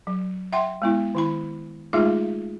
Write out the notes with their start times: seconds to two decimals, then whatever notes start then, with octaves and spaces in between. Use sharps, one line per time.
0.07 F#3
0.53 E5 F#5 G5 C6
0.82 G#3 B3 E4
1.15 D#3 E4 B5
1.93 G#3 A3 D#4 F4 G#4 E5